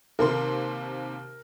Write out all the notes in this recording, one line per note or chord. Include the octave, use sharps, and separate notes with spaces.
D#2 C3 A#4 C6